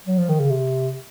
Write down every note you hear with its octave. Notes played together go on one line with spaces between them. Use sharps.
F#3
F3
D#3
C#3
C3